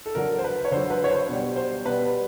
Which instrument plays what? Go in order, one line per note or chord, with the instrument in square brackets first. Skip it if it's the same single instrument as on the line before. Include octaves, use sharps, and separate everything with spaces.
[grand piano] A4
D3 F#3 A#4
C5
B4
C#5
D3 F#3 C5
B4
C#5
C5
B2 G3
C5
B2 G3 B4